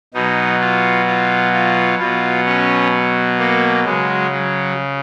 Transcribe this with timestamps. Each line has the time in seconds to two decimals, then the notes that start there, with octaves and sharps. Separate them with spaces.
0.14 B2 F#3 D#4
0.60 F4
1.07 F4
1.54 F4
1.99 B2 F#3 F4
2.46 C#4
3.39 A#3
3.85 C#3 F#3 G#3
4.31 F#3